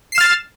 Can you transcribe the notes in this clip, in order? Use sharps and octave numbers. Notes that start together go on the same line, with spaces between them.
F6 A6 C7 E7